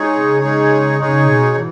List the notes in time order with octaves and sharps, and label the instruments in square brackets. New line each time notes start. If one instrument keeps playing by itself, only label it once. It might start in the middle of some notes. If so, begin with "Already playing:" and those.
Already playing: [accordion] G#3 D#4 G#4 C#5
[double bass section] C#3
[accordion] G#3 D#4 G#4 C#5
[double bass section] C#3 [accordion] G#3 D#4 G#4 C#5
[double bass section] B2
[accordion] E3